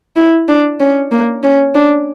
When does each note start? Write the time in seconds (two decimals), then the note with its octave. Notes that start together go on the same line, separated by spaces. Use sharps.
0.16 E4
0.48 D4
0.80 C#4
1.11 A#3
1.44 C#4
1.75 D4